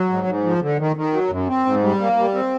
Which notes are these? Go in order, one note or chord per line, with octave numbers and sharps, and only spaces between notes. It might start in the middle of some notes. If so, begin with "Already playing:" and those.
Already playing: F#3
G#2
G#2
F3
D3
D#3
D#3
F#3
F#2
C4
G#2
G3
A#3
G3
C4